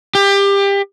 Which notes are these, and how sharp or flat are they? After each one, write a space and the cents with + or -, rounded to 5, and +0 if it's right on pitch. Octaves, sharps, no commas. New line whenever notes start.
G4 +25